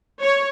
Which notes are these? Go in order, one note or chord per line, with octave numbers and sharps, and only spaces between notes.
C#5